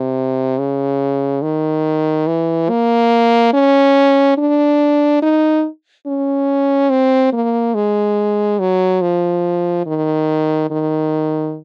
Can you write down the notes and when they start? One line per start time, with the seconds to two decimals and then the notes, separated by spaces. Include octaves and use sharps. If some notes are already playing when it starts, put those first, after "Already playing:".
Already playing: C3
0.59 C#3
1.42 D#3
2.27 E3
2.70 A#3
3.53 C#4
4.38 D4
5.22 D#4
6.07 C#4
6.90 C4
7.33 A#3
7.75 G#3
8.60 F#3
9.02 F3
9.86 D#3
10.70 D#3